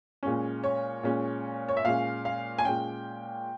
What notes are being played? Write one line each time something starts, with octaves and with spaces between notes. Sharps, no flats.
A#2 G#3 C#4
C#5
A#2 G#3 C#4
C#5
E5
A#2 G#3 C#4 F5
F5
G#5
A#2 G#3 C#4 G5